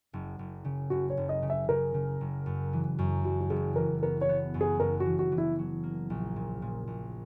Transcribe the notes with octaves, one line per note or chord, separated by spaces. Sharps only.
F#1
F#1
C#3
F#1 F#4
C#5
F#1
D#5
C#3
E5
C#3 A#4
C#3
F#1
F#2
E3
F#2
F#1 F#4
F#4
F#1 G#4
E3 A#4
B3 A#4
C#5
B3
F#2
G#4
F#1 A#4
F#4
E3
F#4
E3
E4
F#3
A#3
A#1
A#2
A#2
A#1